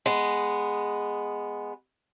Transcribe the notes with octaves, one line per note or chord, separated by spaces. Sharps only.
G#3 B3